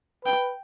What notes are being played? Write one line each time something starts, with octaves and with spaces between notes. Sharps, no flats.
B4 G5